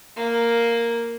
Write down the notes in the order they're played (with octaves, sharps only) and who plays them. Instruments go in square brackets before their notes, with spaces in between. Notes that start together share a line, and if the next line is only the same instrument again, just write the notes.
[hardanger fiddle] A#3